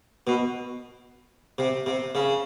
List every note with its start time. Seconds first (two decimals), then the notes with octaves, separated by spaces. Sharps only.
0.27 B2
1.58 C3
1.86 C3
2.15 C#3